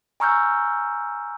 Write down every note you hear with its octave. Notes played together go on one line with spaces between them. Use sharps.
G#5 A#5 C#6 E6 F6 G6